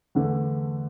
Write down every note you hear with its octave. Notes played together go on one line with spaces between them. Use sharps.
E2 D3 A3